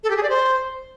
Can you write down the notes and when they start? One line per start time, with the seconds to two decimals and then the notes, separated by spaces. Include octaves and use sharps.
0.04 A4
0.10 G4
0.17 G#4
0.23 D5
0.30 C5